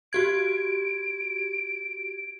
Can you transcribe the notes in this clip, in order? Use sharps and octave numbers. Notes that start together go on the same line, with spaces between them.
F#4 G4 G#6 D7